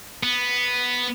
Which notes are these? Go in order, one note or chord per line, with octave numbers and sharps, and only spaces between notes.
B3